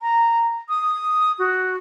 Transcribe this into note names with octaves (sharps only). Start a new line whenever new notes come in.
A#5
D#6
F#4